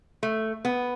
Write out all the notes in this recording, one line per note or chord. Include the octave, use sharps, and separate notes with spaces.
A3
B3